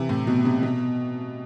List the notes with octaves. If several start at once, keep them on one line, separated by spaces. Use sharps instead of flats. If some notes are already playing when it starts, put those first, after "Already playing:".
Already playing: C3 E3
A2
B2
C3
B2